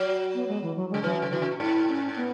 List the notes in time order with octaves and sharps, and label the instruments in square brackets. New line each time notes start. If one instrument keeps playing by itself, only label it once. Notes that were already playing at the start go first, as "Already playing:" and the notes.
Already playing: [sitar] F#3
[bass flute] B3
G#3
E3
F#3
[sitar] C#3 [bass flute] G#3
[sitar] E3 [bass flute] F#3
[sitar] C#3
[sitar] E3 [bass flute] F#4
[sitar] C#3
B2
[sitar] G#2 [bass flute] E4
[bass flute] C#4
B3